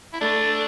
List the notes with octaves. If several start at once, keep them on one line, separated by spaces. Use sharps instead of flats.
E4
A3 D4